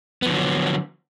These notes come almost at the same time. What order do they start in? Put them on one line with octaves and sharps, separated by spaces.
B3 F3 D3 F#3